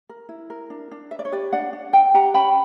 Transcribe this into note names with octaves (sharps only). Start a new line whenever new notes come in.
A#4
E4
A#4
D4
D4
B4 E5
D5
C#5
G4 B4 D5
D4 D5 F#5
D4
B4 E5 G5
G4 F#5 A#5
C#4 G5 B5